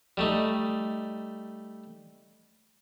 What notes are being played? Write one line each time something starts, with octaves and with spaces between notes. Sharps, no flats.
G3 A3 D#4